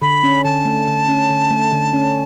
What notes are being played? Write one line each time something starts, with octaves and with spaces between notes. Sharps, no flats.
D3 B5
C#4
D3 A5
A3
D3
C#4
D3
A3
D3
C#4